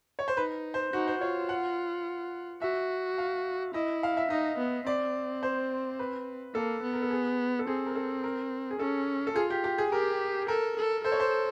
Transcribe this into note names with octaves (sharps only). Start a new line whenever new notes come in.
C#5
C5
D#4 B4
C5
D#4 F#4
C5
F4 C#5
F#5
F#4 E5
F5
E4 D#5
F5
E5
D#4 D#5
B3
C4 D5
C5
B4
A#3 A4
B3
A#4
A4
G#4
A4
C4 G#4
A#4
A4
A#4
G#4
C#4 A4
A4
F4 G#4
G4
G4
G#4
G4 A#4
A4 A#4
A4
A4 C5
C#5
C5